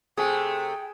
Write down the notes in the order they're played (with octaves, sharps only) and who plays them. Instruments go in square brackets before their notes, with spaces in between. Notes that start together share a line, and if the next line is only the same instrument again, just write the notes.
[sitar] C3 A3 [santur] G#4 [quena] G5